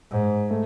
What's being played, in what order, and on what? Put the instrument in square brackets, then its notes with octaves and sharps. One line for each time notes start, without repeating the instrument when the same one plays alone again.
[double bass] G#2
[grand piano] A3